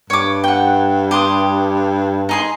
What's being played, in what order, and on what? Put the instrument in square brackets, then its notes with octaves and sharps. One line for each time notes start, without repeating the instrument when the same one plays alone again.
[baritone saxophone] G2 [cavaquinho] C#5 D6
[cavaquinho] F#5 G5
G4 C6 D#6
D#4 G#4 C6